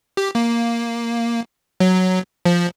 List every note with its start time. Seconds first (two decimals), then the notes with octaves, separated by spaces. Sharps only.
0.17 G4
0.35 A#3
1.80 F#3
2.46 F3